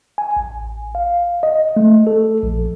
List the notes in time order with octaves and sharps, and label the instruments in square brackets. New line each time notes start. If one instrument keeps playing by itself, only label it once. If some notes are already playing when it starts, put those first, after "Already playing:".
[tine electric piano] G#5
A1
F5
D#5
A3
A4
A#1